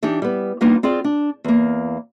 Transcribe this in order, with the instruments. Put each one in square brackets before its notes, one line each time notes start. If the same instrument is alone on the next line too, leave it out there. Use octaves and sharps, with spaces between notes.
[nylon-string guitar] E3 D4 D#4 G4
G3 B3
G3 A#3 B3 D4 D#4 F4
C4 F4 G#4 D5
D4
E2 A#3